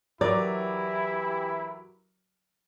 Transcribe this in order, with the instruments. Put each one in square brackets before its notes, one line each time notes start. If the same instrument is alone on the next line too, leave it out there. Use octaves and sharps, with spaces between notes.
[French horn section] E3 G4 [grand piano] F#3 A#4 D6 [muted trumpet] E4 [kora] D5